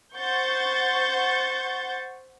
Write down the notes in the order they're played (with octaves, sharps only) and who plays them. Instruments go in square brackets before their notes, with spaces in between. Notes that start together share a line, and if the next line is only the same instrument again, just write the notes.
[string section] C5 F#5 C#6 G6 A6